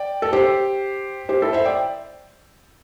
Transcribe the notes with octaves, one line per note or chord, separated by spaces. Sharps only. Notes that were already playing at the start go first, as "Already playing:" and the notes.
Already playing: D5 G5
A4
G4 C5
G4 C5
E4 A4
C5 E5
D5 G5